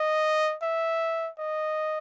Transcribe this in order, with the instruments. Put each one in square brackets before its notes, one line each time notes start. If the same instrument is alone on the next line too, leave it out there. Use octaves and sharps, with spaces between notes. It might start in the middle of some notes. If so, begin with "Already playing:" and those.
Already playing: [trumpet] D#5
E5
D#5